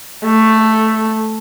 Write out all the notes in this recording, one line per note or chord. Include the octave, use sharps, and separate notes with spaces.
A3